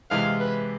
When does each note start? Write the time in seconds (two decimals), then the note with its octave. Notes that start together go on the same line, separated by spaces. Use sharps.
0.11 C3 E3 G#3 F5
0.40 B4